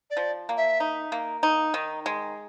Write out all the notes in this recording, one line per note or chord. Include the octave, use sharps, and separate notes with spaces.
D5
F3
A#3
E5
D#4
A#3
D#4
D#3
G#3